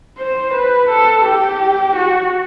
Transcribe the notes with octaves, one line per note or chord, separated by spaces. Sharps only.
C5
B4
A4
G4
F#4